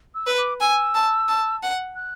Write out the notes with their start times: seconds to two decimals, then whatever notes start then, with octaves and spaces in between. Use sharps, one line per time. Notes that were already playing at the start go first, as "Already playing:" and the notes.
0.15 E6
0.26 B4
0.38 D6
0.61 G#5 E6
0.94 A5
1.28 A5
1.63 F#5
1.96 F#6